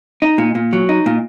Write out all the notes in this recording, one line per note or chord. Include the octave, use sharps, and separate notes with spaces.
D#4
A#2
A#2
F#3
D#4
A#2